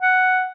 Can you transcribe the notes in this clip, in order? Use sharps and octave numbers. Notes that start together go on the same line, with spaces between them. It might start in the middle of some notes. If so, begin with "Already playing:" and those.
F#5